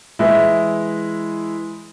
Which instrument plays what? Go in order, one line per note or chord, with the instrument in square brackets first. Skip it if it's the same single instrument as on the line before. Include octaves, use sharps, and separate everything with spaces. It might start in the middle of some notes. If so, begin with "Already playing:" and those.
[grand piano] E3 G#3 E4